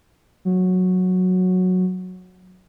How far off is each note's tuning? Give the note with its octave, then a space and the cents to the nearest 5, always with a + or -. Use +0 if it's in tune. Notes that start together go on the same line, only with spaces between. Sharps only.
F#3 -10